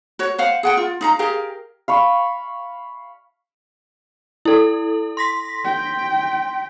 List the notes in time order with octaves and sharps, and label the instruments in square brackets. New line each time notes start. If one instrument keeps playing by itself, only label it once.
[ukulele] F#4 C#5
C5 F5 F#5
G#4 F#5 G5
F4
D#4 F5 A#5
G4 G#4 A#4 F5
[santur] F5 B5 C#6
[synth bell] E4 A4
C6 A#6 B6
[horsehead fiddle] G5